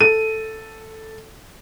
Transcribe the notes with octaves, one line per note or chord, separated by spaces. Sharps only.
A4 D#7